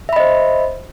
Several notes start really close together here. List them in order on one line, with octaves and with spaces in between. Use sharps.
E5 B5 D#5 C5